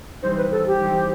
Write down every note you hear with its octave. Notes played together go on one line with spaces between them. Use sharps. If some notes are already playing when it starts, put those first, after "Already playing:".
E3 G3 C4 D#4 C5
B4
A4
G4
E3 G3 C4 D#4